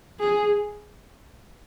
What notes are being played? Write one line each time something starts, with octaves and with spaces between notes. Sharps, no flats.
G#4